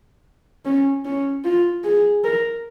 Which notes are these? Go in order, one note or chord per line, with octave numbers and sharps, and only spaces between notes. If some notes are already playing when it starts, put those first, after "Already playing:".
C#4
C#4
F4
G#4
A#4